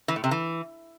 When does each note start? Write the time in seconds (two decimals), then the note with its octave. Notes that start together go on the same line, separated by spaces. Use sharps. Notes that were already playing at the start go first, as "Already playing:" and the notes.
0.08 E3
0.16 A2
0.24 C3
0.31 E3